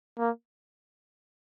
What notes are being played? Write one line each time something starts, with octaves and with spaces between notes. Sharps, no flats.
A#3